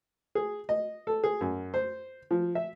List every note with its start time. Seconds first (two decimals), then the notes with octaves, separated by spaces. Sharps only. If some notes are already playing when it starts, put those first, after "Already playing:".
0.35 G#4
0.69 D#5
1.07 A4
1.24 G#4
1.41 F#2
1.74 C5
2.31 F3
2.55 E5